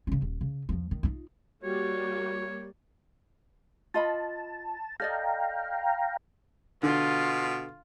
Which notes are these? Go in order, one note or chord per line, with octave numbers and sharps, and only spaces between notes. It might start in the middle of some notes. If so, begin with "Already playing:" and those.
C#3 C#4
D#1
C#3
E2 F3
D#3
D#4 F4
G3 A#3 F#4 C#5
F4 D#5 A5 B5
A4 D5 D#5 F5 G5 A#5
B2 D3 F4